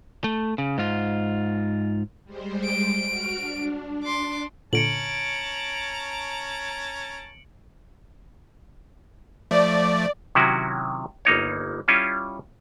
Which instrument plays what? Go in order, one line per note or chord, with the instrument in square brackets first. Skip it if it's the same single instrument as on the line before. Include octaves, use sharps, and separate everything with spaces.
[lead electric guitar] A3
C#3
G#2 F4
[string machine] G3 G#3 C5
[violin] D7
[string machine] F#4 F6
D4
[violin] C6 D6
[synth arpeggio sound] A#2 D3 [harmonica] C#4 A5 A#5 [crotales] C#7 D7 F#7
[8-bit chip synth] F3 A3 [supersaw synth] D5
[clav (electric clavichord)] C3 D#3 F#3 C#4 E4 F#4
G1 A#3 D#4 C#5
G3 C#4 E4 F4